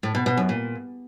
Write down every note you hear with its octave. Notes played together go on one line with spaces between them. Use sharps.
A2
B2
B2
F#2
A#2